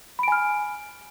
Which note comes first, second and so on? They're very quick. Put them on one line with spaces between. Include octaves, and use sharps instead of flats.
B5 D7 G#5 F6